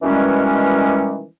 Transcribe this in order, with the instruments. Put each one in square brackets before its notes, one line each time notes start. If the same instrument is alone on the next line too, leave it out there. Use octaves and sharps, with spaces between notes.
[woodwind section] B2 D#3 E3 G3 G#3 C#4